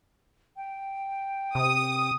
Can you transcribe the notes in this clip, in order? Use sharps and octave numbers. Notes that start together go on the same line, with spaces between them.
G5
C3 D#6